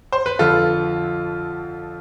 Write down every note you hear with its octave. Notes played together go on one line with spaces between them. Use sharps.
C5
B4
F2 D3 F4 A4